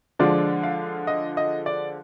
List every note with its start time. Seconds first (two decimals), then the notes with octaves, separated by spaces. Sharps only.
0.19 D3 F3 G#3 D4 F4 D5
0.63 F5
1.07 D#5
1.37 D#5
1.66 D5